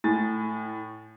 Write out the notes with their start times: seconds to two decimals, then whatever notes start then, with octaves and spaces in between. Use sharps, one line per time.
0.04 A2 G#5 A6